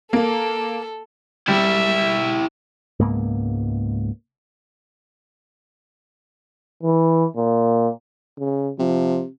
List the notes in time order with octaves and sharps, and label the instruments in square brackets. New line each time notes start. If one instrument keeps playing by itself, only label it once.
[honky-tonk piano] A#3 [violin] A4
[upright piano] G3 [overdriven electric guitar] E4 G4 [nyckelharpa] E5
[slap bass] C#2 G#2 A#3 B3
[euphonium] E3
A#2
[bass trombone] C#3
[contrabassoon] C3 [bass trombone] F3